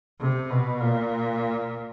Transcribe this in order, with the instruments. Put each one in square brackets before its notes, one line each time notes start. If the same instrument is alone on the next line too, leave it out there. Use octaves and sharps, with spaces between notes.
[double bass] C3
B2
A#2